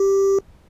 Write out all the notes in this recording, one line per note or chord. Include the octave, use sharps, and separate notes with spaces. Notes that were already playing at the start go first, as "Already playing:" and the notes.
Already playing: G4